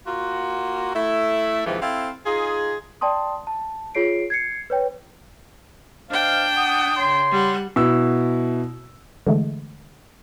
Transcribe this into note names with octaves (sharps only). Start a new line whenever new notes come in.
A#3 F4 F#4
A3 E4
D#2 G#2 C3 E3 F3
C4 E4 A4 F5
D#4 F4 G#4
D5 G5 A5 C6 D#6
A5
F4 G#4 C#5 C7 D7
G#6 C7 C#7
B4 C#5 G5
D4 C5 D#5 F5 G5
F#5 D#6
C#3 C#5 C6
G3 F#5
B2 E4 E6
D3 E3 G#3 A3